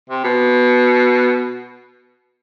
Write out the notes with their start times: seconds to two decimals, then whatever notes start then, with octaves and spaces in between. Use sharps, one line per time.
0.10 C3
0.24 B2